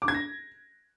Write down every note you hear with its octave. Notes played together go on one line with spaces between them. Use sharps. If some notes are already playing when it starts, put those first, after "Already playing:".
D6
G#6
A#6